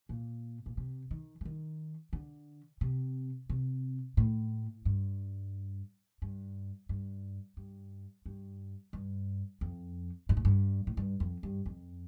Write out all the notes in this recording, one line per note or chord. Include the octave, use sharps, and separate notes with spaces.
A#2
A#2
C3
D#3
F3
D#3
D3
C3
C3
A2
G2
G2
G2
G2
G2
G2
F2
G2
A2
G2
A2
G2
F2
G2
F2